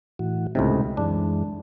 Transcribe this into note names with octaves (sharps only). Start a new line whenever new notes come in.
A2 E3 F#4
C#2 A2 C3 D#4
F#2 E3 G#3 D4